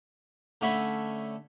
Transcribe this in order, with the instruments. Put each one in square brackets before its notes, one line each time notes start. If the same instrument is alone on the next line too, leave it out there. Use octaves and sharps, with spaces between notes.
[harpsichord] D3 A3 C#4 C#5 E5 B5